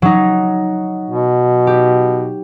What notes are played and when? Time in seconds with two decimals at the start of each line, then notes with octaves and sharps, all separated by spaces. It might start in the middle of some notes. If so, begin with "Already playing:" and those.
0.02 F#3 D#4
1.10 B2
1.67 G4